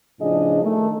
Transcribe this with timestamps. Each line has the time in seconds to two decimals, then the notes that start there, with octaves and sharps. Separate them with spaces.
0.20 A2 C#3 F3 D4 G#4 D#5
0.63 D#3 A3 A#4